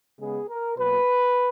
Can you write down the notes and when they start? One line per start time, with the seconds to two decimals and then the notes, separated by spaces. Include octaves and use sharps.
0.20 C#3 G#3 B3 G#4
0.49 A#4
0.77 B2 F#3 A#3 B4